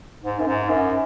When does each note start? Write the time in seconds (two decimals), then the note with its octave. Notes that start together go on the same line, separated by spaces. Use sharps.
0.23 G#2
0.40 F#2
0.47 G#2
0.69 F#2